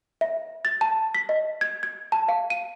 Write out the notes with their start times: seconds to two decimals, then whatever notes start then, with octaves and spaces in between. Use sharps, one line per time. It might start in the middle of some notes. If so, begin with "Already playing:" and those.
0.21 E5
0.65 A6
0.81 A5
1.15 B6
1.29 D#5
1.61 G#6
1.83 G#6
2.12 A5
2.29 F5
2.50 D#7